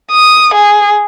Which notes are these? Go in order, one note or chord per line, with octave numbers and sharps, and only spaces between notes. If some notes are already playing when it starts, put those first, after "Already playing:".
D#6
G#4